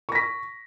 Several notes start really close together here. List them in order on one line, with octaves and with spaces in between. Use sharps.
C#6 A#6 B6